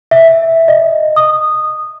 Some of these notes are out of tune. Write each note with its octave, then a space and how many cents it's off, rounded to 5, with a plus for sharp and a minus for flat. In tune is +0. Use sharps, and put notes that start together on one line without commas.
E5 -5
D#5 -15
D#6 -10